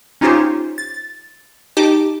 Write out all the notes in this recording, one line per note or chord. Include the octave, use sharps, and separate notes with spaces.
C#4 D#4 F4 G4 C5 C#5
A6
D#4 G4 A5 D6